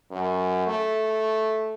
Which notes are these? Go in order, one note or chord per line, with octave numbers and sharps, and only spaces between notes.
F#2
A3